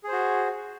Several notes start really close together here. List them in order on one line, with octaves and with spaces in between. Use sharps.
G#4 C5 F#4